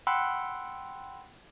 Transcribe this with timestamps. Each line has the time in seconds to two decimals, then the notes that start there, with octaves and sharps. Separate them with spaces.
0.07 F#5 G5 B5 C6 E6 F#6